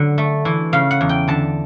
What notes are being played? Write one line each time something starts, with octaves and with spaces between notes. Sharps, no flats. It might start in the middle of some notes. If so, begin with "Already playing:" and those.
Already playing: D3 F#3
A3
E3
C#3 F5
F#5
E2
G5
D3 A5